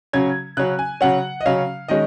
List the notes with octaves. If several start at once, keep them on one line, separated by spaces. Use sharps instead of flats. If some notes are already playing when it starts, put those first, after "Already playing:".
C#3 F#3 C#4 G#6
C#3 F#3 C#4 F#6
G#5
C#3 F#3 C#4 F#5
D#5
C#3 F#3 C#4 F5
D#3 G#3 C#4 D#5